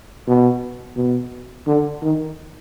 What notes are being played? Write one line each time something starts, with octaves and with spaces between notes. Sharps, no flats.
B2
B2
D3
D#3